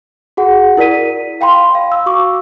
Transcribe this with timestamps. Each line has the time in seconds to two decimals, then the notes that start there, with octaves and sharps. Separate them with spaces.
0.37 F#4 G#4 F#5
0.77 E4 A#4 D5 B6 D#7
1.41 F5 G5 B5 C6
1.75 F5
1.92 E6
2.06 F#4 C#6 D6